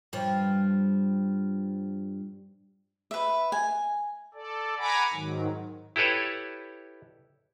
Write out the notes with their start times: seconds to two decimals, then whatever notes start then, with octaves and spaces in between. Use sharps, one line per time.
0.13 G2 F3
3.11 B4 E5
3.52 G#5
4.34 A4 D5
4.78 F#5 G#5 A#5 B5 D6
5.13 G#2 D#3 F#3
5.96 E4 G4 A4 B4 C#5